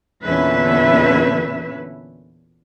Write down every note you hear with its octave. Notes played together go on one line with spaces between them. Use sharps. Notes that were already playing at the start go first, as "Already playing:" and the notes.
E2 A#2 D3 C#4 B4 E5